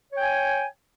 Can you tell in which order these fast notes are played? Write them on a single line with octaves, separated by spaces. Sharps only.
C#5 G5 G#5